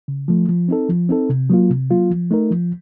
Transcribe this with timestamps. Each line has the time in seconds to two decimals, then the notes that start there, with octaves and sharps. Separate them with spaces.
0.08 C#3
0.28 F3 A3
0.49 F3
0.69 C4 D#4 A4
0.89 F3
1.09 C4 D#4 A4
1.29 C3
1.50 F#3 A#3 F4
1.70 C3
1.90 F#3 A#3 F4
2.10 F3
2.31 A3 D#4 A#4
2.51 F3